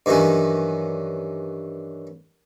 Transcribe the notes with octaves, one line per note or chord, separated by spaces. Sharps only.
G2 D#3 E3 F#3 C#4